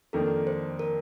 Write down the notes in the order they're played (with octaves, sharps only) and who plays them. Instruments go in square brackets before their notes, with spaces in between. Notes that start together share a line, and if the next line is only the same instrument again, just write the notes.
[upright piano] F2 D#3 A#3 D4 [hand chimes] A4
[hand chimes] C5
A#4